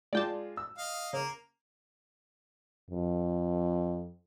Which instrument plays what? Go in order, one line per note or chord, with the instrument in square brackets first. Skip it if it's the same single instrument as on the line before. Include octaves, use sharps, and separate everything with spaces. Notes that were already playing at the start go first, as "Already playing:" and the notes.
[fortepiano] G#3 F4 D6 [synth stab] D5 G5 A5
[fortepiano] E6
[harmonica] D#5 F5
[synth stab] C#3 [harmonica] A#3
[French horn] F2